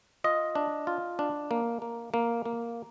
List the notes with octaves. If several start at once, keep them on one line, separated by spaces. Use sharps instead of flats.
F4 D#5
D4
F4
D4
A#3
A#3
A#3
A#3